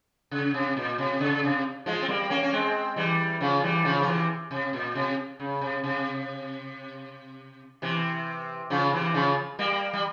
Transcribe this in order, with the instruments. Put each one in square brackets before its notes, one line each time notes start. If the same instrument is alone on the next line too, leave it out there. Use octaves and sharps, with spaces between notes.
[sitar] C#3
C3
A#2
C3
C#3
C3
F3 G#3
C4
G3 A#3
A#3 C#4
C#4
G#3 C4
E3 G3
C#3 F3
E3 G3
C#3 F3
F3
C3 E3
C3
A#2
C3
C#3
C3
C3
C3 E3
C#3 F3
C3 E3
C#3 F3
G3 A#3
G3